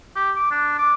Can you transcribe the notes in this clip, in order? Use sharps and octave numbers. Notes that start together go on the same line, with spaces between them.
G4
D6
D4
D6